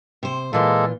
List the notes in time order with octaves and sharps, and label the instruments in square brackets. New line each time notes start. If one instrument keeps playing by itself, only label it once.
[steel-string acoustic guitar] C3 C5
[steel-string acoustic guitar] A#2 E3 F4 [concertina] G#3 A#3 A4